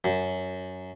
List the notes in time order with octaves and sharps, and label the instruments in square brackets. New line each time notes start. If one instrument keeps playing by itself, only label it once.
[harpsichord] F#2